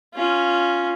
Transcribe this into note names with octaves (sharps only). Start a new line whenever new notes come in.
C#4 F4